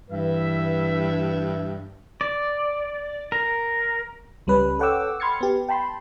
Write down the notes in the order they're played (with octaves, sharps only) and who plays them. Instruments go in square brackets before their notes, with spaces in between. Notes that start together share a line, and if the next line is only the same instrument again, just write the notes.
[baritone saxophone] G2 [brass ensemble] E3 B4 E5
[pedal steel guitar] D5
A#4
[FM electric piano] C#2 G3 C#4 B4
A4 C#5 F#5 G5 D6 E6
B5 C6 F6 G#6 A6 C#7
B3 G4
G5 A5 B5 C6